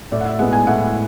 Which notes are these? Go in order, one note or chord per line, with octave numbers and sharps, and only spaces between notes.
A2 D5
F#5
E5
G#3 B3 F#5
G#5
A2 F#5